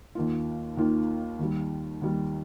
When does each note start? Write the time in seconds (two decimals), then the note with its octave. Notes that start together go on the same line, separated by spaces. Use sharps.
0.15 D#2 D#3 A#3 F4
0.77 D#2 D#3 A#3 F4
1.39 D#2 D#3 G3
2.02 D#2 D#3 G3